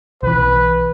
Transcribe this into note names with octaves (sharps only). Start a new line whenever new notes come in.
B1 E3 B4